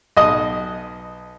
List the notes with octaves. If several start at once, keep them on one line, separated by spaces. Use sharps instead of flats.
B1 D#5 D#6